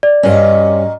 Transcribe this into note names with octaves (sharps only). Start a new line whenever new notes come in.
D5
G2 A#2 C#4 F#4 D#5